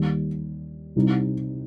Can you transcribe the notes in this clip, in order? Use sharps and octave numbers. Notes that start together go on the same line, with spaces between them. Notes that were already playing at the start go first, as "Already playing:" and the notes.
Already playing: D#2 D#3 G3
C2 C3 G3 C4 D#4